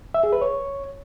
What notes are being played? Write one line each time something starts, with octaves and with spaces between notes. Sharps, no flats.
E5
G#4
B4
C#5